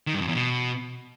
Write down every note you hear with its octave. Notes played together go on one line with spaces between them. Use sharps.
D#3
G2
F2
E2
B2